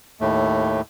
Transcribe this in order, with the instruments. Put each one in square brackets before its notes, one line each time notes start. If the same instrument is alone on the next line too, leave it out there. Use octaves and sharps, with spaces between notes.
[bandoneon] D#2 A2 A3